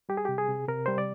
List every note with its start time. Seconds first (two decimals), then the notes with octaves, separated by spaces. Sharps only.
0.09 G3 G4
0.17 G#4
0.25 C3 G4
0.38 G#4
0.48 C3
0.68 C3 A#4
0.86 G3 C5
0.98 D5